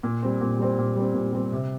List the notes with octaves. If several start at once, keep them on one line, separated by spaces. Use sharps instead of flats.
A#2
G3 C4
A#2
G3 C4
A#2
G3 C4
A#2
G3 C4
C3